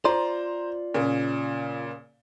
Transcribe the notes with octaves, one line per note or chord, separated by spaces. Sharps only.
F4 C5 D5 A#5 C6
A#2 C#3